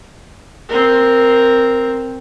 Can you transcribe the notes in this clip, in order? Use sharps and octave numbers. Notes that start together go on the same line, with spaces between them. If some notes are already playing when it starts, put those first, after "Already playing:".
C4 A#4